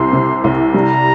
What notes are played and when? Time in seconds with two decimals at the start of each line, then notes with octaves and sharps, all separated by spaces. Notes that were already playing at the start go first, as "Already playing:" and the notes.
Already playing: C2 C3 C6
0.13 C3
0.44 C2
0.74 G3 A#5